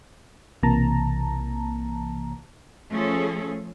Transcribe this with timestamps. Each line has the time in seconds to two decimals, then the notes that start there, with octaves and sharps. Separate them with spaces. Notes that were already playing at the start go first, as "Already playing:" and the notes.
0.63 B1 C3 E3 A#3 A5 A#5
2.92 F3 A3 C#4 G#4 A4